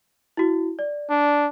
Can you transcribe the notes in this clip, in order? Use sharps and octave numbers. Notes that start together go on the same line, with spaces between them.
E4 F#4
D5
D4